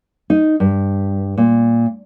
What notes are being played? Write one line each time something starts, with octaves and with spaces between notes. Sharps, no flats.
D#4
G2
A#2